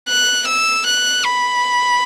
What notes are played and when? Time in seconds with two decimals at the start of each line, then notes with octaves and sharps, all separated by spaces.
0.09 F#6
0.48 E6
0.87 F#6
1.24 B5